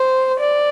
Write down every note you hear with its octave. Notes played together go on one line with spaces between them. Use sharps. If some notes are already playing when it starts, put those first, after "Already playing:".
Already playing: C5
D5